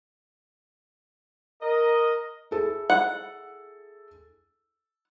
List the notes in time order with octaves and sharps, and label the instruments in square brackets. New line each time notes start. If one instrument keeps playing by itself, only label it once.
[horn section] A#4 D#5
[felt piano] E4 G#4 A4
[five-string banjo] F#5